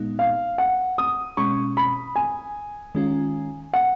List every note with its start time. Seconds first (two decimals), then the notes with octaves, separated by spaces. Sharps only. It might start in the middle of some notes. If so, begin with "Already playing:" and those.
Already playing: A#2 G#3 B3 D#4
0.19 F5
0.58 F#5
0.98 D#6
1.37 B2 G#3 C#4 C#6
1.77 B5
2.16 G#5
2.95 D#3 G#3 C#4 F4
3.73 F#5